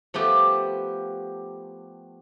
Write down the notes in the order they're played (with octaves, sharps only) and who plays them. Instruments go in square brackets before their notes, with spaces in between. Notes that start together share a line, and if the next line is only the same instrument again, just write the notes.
[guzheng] F3 A3 B3 G4